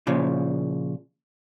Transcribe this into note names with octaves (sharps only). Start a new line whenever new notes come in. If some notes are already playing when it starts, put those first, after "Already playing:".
A#2 C#3 F3